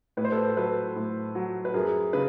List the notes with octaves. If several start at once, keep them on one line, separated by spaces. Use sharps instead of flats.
A2 B4
C5
A4 B4
F#3 A4 B4
A2
F#3
B4
F#2 G#4 A#4
C#3 B4